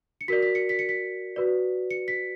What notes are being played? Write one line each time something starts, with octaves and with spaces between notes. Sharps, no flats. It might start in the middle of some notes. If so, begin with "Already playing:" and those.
C#7
F#4 A#4 D5 B6
B6
C#7
B6
C#7
B6
F#4 B4 D5
C#7
B6